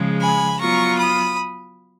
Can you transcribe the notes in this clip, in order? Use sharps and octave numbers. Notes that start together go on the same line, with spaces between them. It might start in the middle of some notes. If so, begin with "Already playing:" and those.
Already playing: C#3 F3 G#3
G#5 B5
F#3 B3 F4 A#5 C#6
B5 D#6